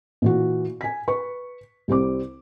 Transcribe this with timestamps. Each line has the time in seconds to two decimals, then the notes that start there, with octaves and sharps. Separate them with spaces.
0.22 A#2 E3 F#4
0.81 G#5 B6
1.08 B4 C#6
1.88 C2 G3 C4 D6